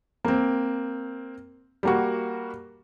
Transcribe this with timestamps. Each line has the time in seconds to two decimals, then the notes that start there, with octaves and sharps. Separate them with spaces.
0.25 A#3 C4
1.83 G3 A#3 F#4